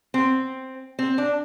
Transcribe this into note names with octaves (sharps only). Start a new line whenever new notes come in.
C4
C4
D4